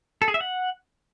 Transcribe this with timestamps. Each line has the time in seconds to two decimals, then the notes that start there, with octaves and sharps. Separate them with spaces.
0.22 A4
0.28 G#4
0.34 E5
0.41 F#5